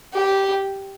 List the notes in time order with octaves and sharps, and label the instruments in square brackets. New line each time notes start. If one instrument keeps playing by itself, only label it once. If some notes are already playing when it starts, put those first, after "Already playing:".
[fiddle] G4